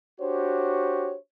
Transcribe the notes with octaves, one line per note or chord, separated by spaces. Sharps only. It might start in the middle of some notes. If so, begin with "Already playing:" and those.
D4 F#4 G4 C5 C#5